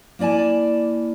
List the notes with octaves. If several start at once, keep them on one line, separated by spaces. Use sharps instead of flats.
A#3 E4 D5 G#5 A5